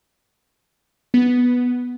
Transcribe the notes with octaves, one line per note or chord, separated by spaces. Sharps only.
B3